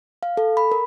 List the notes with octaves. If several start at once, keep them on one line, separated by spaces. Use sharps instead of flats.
F5
A4
B5
A#4